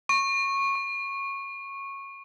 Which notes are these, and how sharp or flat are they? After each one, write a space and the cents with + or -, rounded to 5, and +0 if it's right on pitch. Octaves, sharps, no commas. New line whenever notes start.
C#6 -15
C#6 -15